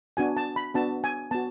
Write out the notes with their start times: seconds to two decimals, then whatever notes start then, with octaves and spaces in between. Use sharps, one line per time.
0.17 B3 D4 F#4 G#5
0.37 A5
0.56 B5
0.74 B3 D4 F#4 A5
1.04 G#5
1.31 B3 F#4 A5